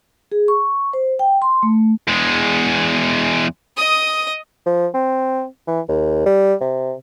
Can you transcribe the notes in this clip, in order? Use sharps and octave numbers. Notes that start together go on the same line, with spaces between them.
G#4
C#6
C5
G5
C6
A3
E2 G#3
D#5 D#6
F3
C4
E3
D#2
G3
C3